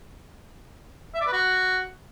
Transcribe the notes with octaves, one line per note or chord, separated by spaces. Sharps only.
E5
D5
B4
F#4